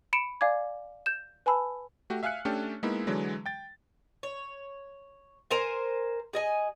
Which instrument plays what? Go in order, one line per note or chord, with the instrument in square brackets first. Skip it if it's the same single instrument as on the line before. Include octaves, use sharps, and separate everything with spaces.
[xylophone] B5 C#7 D7 E7
D5 F5 G#5 D6 G#6
G6 E7
B4 G#5 A5 B5 E6
[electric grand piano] A3 F#4 G4
E5 F5 G#5 F6 F#6 C#7
A3 C#4 D4 G4 A4
G#3 A#3 B3 D#4 E4 E5
D3 E3 F#3 G#3
G5 A6
[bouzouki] C#5
A#4 C5 G#5
G#4 D#5 G#5